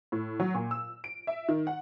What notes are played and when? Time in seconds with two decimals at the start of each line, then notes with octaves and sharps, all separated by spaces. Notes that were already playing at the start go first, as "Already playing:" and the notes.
0.12 A2
0.40 F#3
0.55 A#2
0.71 E6
1.04 D7
1.27 E5
1.49 D#3
1.67 F#5